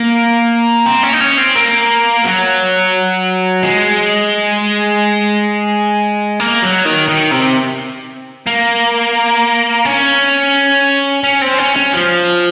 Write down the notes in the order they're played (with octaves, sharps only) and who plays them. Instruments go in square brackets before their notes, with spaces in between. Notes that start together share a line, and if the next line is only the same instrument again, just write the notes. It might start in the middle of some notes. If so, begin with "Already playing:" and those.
Already playing: [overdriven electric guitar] A#3
C4
C#4
D#4
C#4
C4
A#3
F#3
G#3
A#3
F#3
D#3
D#3
C3
A#3
C#4
C#4
C4
C#4
C#4
F3